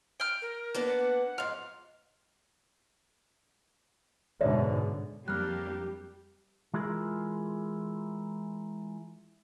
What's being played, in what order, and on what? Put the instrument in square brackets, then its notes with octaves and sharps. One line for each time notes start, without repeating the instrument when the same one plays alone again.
[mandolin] G5 F6
[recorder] A#4
[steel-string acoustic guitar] A#3 B3 D4
[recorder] F#5
[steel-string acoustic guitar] F2 G#2 [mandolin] F5
[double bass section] G#2 B2 D3 [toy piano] C#5 D5 E5
[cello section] F2 A#3 D4 [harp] G3 [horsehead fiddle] G4 [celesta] F6 F#6
[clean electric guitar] E3 G#3 E4 F4 G#4 A#4